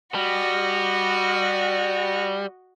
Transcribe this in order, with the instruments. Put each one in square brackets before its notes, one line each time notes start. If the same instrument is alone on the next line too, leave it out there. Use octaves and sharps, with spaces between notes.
[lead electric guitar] G3 [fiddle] F#4 D#5